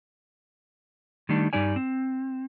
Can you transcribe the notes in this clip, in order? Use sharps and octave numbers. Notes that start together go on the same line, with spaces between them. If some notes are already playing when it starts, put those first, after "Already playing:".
D#3 G3 A3 D4 D#4
G2 G3 D#4 D5 G#5
C4